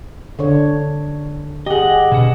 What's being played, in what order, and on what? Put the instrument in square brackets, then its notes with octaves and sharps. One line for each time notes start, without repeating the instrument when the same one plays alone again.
[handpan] D3 D4 C#5
[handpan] G4 G#4 [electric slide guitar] D#5 F#5
[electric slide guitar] B2 D4 F#5